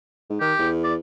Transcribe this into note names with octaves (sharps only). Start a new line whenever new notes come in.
G#2
D#3 G4
E2
D5